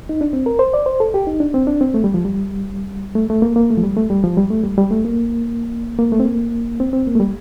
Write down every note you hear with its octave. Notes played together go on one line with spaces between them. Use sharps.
D#4
D4
C4
A#4
C5
D5
C5
A4
G4
D#4
D4
C4
D4
C4
A3
G3
F3
G3
A3
A3
A#3
A#3
A3
F3
G3
A3
G3
F3
G3
A3
G3
G3
A3
A#3
A#3
A3
C4
A#3
C4
C4
A#3
A3
G3